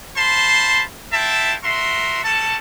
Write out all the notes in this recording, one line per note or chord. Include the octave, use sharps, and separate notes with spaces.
C5 F5 A5 B5 C6
E4 F4 E5 G5 A5
F#4 A#4 E5 C6
G3 F#4 A4 A5